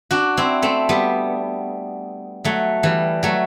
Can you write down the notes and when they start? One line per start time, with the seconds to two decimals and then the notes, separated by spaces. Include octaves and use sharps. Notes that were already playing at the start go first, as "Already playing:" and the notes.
0.11 D4 F#4
0.37 C4 E4
0.62 A3 C4
0.89 G3 B3
2.44 F#3 A3
2.83 E3 G3
3.23 F#3 A3